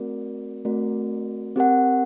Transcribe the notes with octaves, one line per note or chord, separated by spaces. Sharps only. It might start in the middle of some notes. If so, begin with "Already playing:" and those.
Already playing: A3 C4 F#4 A#4 D5
A3 C4 F#4 A#4 D5
C4 G4 A#4 F#5